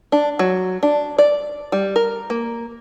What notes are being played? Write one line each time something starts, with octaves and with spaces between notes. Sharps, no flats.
D4
F#3
D4
D5
G3
A#4
A#3